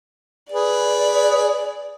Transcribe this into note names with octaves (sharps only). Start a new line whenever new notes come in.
G#4 B4 D5